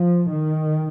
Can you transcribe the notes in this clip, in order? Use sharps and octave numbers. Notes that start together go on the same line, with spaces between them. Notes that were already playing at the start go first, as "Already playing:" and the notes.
Already playing: F3
D#3